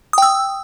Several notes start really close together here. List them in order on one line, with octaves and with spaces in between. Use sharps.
D#6 G5 E6